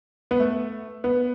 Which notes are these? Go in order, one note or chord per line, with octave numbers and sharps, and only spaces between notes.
B3
A3
B3